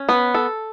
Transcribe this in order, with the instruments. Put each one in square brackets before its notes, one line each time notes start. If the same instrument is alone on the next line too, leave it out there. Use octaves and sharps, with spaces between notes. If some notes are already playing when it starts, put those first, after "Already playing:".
Already playing: [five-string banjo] C#4
B3
A4